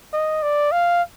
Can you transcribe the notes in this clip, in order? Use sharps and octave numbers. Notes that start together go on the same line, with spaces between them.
D#5
D5
F5